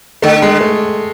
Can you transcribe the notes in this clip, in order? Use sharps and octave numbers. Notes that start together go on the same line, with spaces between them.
D3 A3
G#3
A3